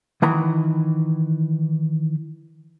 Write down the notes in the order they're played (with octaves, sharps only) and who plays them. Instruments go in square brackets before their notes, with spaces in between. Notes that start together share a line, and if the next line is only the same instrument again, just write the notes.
[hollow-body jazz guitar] D#3 E3 F#5 A#5 B5